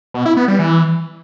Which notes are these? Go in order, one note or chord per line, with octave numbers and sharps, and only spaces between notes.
B2
E4
B3
G3
E3